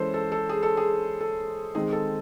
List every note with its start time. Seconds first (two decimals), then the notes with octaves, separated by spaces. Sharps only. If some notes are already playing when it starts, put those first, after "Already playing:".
Already playing: E3 G#3 C#4 A4 C5
0.14 A4
0.32 A4
0.49 G#4
0.63 A4
0.77 G#4
1.21 A4
1.75 D#3 G#3 C4 D#4 G#4
1.92 A4